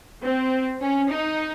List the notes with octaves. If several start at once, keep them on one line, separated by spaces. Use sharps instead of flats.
C4
C#4
D#4